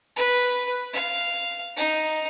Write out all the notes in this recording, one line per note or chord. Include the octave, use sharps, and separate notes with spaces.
B4
F5
D#4